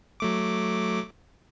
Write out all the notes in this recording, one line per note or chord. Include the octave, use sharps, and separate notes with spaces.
F#3 A3 D6